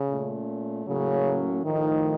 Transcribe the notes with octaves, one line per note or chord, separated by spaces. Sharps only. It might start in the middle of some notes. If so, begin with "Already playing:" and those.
Already playing: C#3
A#2 A3 C#4
A2 C#3 F#3 A#3 C#4
A2 D#3 F3 A3 D#4